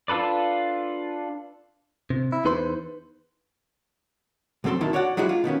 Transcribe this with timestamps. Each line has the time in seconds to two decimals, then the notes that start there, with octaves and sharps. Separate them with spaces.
0.08 D4 F4 A4 B4 D5
2.10 C3
2.32 E4
2.45 E2 D#4 B4 C5 C6
4.64 B1 F#3 C4 A4 C6
4.81 D2 B2 D#3 E4 A4
4.93 F#4 C#5 D5 F#5
5.17 F#3 G#3 E4 F#4 G4
5.29 F4
5.44 B2 D#3 B3 C#4